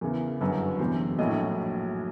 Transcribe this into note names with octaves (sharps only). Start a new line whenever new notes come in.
E2 C#3 E3 A#4
G1 F#2 D3 F#3 B4
F#1 E2 C3 C5
A#1 A2 F#3 A3 D#5